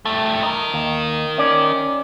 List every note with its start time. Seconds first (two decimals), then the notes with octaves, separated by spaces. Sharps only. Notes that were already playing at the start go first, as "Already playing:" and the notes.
0.05 G2 A3
0.43 D#4 A#4
0.74 D#2
1.38 C#4 D5